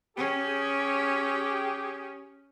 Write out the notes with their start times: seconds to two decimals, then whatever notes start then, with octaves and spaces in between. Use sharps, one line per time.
0.17 C#4 G4 G#4